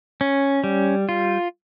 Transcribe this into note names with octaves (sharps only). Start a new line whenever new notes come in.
C#4
G3
F4